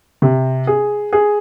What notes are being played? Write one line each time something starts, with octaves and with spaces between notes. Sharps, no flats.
C3
G#4
G#4